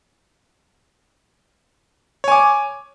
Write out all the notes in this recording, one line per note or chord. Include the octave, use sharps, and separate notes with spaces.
C#5 G#5 D6